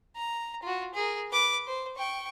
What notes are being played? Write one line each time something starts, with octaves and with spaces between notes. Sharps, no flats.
A#5
F4 F#4
G#4 A#4
B4 D6
C5
G5 C#6